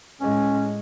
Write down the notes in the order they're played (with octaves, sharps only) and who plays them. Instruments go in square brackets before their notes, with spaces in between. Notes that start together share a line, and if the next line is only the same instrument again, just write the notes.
[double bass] A2 G#3 [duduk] C#4